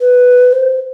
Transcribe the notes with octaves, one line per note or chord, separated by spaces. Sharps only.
B4
C5